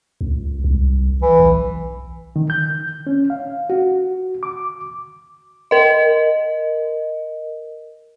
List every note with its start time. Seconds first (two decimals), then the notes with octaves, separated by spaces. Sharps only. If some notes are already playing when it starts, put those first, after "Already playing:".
0.21 C#2
0.64 C2
1.22 E3
1.39 B1
2.36 D#3
2.50 G6
3.07 C#4
3.30 F5
3.70 F#4
4.43 D6
5.71 A#4 D#5